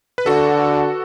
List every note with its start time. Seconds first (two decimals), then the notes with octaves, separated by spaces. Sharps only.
0.18 B4
0.26 D3 F#4 A4